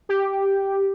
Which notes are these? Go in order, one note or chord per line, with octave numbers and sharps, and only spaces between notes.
G4